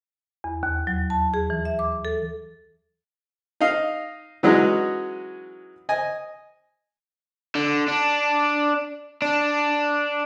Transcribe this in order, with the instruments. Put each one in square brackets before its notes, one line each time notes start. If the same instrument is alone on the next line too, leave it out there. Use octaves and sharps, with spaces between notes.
[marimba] E2
D#2
F#3
A5
G#4
E3
E5
D6
A4
[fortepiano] D#4 D#5 F5
E3 F#3 G#3 C#4 D#4 F#4
D#5 G#5
[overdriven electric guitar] D3
D4
D4